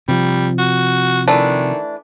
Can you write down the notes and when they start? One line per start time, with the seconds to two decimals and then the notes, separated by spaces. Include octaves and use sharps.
0.08 C3 F3 G3
0.58 F#4
1.28 D#3 E3 A3 D4